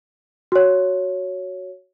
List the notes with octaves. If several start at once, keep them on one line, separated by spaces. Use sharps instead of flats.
F#4 C#5